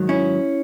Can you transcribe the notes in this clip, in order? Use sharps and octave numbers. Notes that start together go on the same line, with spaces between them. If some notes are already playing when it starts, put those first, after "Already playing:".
Already playing: G#2 D#3 F#3
C#4 E4